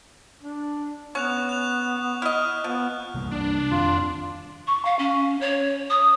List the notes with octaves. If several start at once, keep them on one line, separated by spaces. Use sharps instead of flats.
D4
B3 C#4 C#6 F#6 F7
F#6 F7
E4 D#5 F6
F3 B3
C3 G3 A#3
D4
F2 D#3 C4 F4
C#6
F5
C#4
C#5
D#6